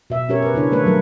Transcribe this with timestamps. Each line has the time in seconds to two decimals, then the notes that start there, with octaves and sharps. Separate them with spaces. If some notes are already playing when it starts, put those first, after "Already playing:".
0.10 B2 E5
0.29 B2 C#4 G4 A#4 C#5
0.43 A#4 B4
0.54 C#3 D4 E4 C#5
0.71 D#3 A3 A#3 A4 B4 C#5
0.85 F#3 G3 A#4